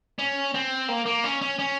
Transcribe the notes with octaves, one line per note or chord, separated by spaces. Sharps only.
C#4
C4
A#3
A#3
C#4
C#4
C#4